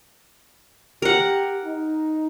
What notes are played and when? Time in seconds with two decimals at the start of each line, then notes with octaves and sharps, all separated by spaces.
1.02 G4 A#4 F#5
1.65 D#4